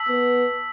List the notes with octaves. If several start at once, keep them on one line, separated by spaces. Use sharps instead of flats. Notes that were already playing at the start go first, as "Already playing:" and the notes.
Already playing: A5 E6 B6 F#7
B3